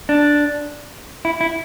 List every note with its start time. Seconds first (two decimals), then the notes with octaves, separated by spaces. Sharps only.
0.09 D4
1.25 E4
1.41 E4